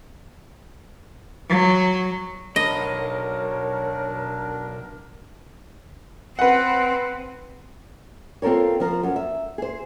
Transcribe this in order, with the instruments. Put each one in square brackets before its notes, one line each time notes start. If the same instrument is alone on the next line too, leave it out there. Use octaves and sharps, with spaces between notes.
[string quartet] F#3
[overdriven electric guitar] B1 B5 [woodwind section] D4 A#4 [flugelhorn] C#5 [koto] D#5
[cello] C4 [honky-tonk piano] B4 F#5
[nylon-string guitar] C4 F4 A4 A#4 C#5
F3 A#4
F#2
E5
G#4 C5